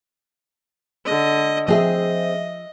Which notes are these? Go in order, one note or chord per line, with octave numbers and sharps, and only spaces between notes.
D3 D#5
F3 C4 G#4 D#5 E5